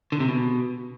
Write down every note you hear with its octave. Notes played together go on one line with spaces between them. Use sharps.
D3
C3
B2